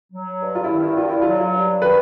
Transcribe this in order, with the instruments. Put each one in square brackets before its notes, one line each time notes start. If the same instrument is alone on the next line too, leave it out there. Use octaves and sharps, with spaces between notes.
[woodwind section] F#3
G2
[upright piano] F4
E4
[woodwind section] D#3
[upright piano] E4
[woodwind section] G2 [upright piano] F4
[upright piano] E4
F4
[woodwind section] F#3
[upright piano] F4
[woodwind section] G2
[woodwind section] D#3 [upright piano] B4